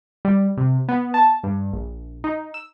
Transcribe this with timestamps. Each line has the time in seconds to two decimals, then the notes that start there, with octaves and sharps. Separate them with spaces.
0.25 G3
0.57 C3
0.88 B3
1.14 A5
1.44 G2
1.73 A#1
2.24 D#4
2.54 E6